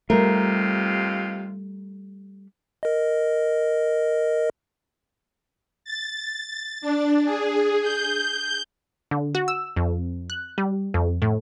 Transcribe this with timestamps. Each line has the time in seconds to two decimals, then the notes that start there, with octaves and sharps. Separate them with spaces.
0.10 D#2 C3 G3 A3 F4 A#4
2.83 A#4 D#5
5.85 A6
6.81 D4
7.25 G#4
7.82 G6
9.11 D3
9.35 F#4
9.48 E6
9.76 F2
10.30 F#6
10.58 G3
10.94 F2
11.22 A2